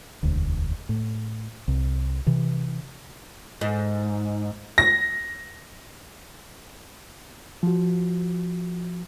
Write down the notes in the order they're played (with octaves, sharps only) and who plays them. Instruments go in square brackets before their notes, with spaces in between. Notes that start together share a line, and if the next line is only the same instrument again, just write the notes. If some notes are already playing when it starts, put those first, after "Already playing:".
[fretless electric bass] E1 D2
A2
C2
C3 E3
[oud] G#2
[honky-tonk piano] A#6
[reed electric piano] F3 F#4